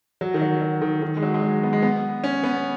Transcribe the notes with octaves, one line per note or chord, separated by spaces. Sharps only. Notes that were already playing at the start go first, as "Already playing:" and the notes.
F#3
D#3
F#3
F#3
D#3
D#3
G#3
F#3
G#3
F#3
B3
G#3
B3
C#4
B3